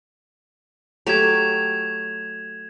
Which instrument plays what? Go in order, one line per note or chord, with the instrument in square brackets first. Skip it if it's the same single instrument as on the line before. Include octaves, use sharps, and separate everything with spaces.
[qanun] F#3 A3 G4 [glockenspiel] G#6 E7 F7